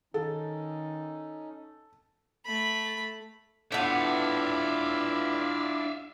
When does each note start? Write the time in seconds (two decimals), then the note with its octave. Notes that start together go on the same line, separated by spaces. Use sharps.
0.14 D#3 C#4 D#4 A4
2.45 A3 B5
3.72 A2 G3 B3 D4 E4 F4 E5 F5